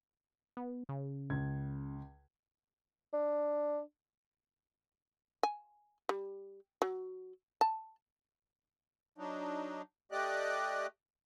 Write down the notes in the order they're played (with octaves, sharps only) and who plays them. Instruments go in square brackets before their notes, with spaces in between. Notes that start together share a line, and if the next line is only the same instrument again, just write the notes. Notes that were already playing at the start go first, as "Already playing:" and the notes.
[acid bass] B3
C#3
[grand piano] C#2 G#6
[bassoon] D4
[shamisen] G#5
G3
F#3
A5
[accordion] F#3 D4 D#4
A3 G4 D5 D#5 F#6